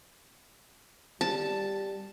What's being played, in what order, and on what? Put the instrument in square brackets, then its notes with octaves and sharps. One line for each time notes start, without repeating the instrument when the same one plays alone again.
[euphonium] G3 [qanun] A5